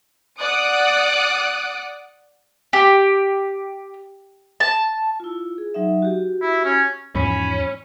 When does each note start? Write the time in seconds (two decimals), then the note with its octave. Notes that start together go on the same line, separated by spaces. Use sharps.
0.41 D5 F#5 D#6 F#6 D7
2.73 G4
4.60 A5
5.20 E4 F4
5.58 G#4
5.74 F#3 D#4 E5
6.02 F#4 G4
6.42 E4
6.64 C#4
7.15 E2 G#2 F3 C#4 B5